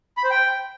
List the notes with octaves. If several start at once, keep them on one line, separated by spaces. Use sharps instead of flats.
B5
C5
G5